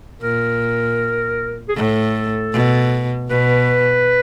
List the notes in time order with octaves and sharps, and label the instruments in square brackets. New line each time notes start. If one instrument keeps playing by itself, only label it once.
[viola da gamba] A#2 [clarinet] A#4
[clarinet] G#4
[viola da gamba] A2 [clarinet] A4
[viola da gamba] B2
[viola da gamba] B2 [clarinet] B4